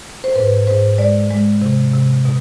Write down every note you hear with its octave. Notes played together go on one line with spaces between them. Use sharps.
C5
G#2 B4
G#2 C5
G#3 D5
G#3
C3
C3
B2